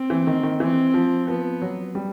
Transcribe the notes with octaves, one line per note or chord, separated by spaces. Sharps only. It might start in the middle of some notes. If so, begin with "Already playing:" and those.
Already playing: C4
E3
D#3
D#3
E3 C4
F3
F3 B3
F#3
G3